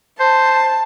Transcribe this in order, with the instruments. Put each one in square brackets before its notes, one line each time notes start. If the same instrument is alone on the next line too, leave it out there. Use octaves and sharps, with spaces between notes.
[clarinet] C5 [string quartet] A5